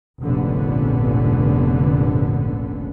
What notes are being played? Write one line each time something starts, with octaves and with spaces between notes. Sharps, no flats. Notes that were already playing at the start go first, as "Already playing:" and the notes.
F1 A#1 G#2 D3 B3 C#4